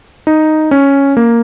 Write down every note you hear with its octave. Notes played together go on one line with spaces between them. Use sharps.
D#4
C#4
A#3